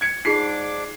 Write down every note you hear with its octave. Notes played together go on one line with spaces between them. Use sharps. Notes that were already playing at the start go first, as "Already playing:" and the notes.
G#6 C#7
G#2 D4 D#4 F4 G#4 D6 C7